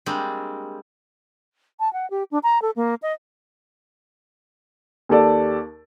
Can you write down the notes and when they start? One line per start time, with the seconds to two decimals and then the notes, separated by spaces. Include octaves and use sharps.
0.06 G3 G#3 A#3 C4 D4
1.80 A5
1.93 F#5
2.10 G4
2.31 D4
2.43 A#5
2.62 A4
2.76 A#3
3.02 D#5
5.09 D#2 G4 A4 D5 A5